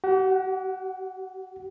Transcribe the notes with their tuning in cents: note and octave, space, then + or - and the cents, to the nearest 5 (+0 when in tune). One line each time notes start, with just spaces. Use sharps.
G4 -45 F#5 +0